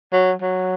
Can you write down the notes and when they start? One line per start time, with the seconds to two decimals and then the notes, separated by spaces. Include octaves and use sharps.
0.12 F#3
0.42 F#3